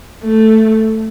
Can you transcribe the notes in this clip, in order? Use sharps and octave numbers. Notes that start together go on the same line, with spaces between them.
A3